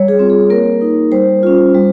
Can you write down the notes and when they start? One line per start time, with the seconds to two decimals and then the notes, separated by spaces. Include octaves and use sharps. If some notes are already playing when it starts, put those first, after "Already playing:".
Already playing: G3 C#5
0.08 G#4
0.19 C4 F4
0.30 G#4
0.50 A#3 A#4
0.81 D#4
1.12 G3 C5
1.43 C#4 F4
1.74 G3